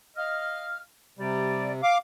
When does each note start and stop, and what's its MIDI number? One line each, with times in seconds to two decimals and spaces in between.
0.17 0.79 75
0.17 0.79 77
0.17 0.79 89
1.18 1.81 48
1.18 1.71 55
1.18 1.71 67
1.18 1.71 74
1.83 1.98 77
1.83 1.98 86